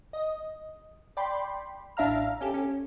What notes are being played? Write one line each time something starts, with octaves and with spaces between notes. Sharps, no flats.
D#5
D5 G5 B5 C6
A1 D4 E5 F5 A#5 F6
C#4 G4 A4
C#4